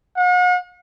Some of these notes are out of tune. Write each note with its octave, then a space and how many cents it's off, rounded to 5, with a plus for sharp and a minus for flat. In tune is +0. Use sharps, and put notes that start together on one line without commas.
F#5 -45